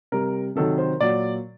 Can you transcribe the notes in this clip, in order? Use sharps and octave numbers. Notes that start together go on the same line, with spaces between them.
C3 G3 A#4
C3 D#3 F#3 A4
C5
A#2 F#3 D5